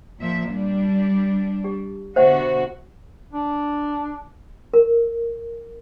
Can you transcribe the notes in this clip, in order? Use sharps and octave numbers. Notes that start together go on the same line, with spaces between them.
A#2 F3 E5
G3 D4
G4
B2 D3 F#4 C5 E5 F#5
D4
A#4